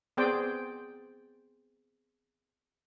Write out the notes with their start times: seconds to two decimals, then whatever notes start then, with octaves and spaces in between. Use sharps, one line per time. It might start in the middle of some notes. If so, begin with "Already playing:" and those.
0.17 B3 C4 G#4 C5 D5 G5